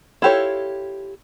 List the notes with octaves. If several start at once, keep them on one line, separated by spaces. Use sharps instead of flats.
E4 F4 G4 A4 C#5